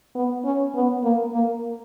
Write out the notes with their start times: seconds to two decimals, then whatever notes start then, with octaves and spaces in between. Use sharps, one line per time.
0.15 B3
0.45 C#4
0.75 B3
1.03 A#3
1.33 A#3